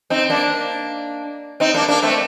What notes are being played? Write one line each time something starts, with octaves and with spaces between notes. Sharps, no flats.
C4 D#4
A#3 D4
C4 D#4
A#3 D4
A#3 D4
A3 C4